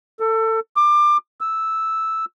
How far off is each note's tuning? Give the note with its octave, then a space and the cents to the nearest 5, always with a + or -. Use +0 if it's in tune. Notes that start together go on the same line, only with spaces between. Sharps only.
A4 +25
D6 +25
E6 -5